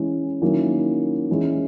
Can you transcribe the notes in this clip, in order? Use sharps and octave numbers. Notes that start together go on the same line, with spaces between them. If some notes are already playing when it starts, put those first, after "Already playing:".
Already playing: E3 G#3 C#4 E4
D#3 F#3 A#3 C#4 E4
E3 G#3 C#4 E4